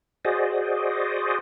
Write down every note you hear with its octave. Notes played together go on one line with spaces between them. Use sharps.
F#4 G#4 C5 D5 D#5